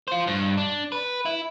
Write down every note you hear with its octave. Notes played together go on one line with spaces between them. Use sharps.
F4 C5
G2
D4
B4
E4